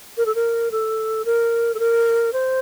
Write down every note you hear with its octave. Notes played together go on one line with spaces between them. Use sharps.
A#4
A4
A#4
A4
A#4
A4
A#4
C5